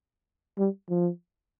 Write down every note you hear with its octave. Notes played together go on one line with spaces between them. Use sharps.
G3
F3